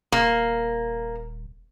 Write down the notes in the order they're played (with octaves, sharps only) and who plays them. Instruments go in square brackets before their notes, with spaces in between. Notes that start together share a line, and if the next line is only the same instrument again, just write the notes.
[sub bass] D#1 [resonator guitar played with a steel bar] A#3